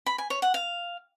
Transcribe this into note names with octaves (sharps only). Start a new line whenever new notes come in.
B5
G#5
C#5
F#5
F5